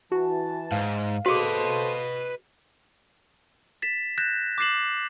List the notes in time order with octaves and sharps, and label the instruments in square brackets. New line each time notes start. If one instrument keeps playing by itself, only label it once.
[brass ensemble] E3 A5 [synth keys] F#4
[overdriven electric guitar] G#2 [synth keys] F5
[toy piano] F#4 G#4 [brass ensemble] A4 C5 [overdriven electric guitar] B4 D#5
[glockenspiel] A6 B6 E7
F#6 G6 A6 A#6 E7
D6 F#6 A6 C7 E7 F#7